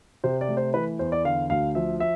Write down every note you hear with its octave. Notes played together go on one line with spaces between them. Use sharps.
C3 C5
D5
A3
C5
E3 B4
E2 C5
D5
D3 F5
D2 F5
F3 E5
E5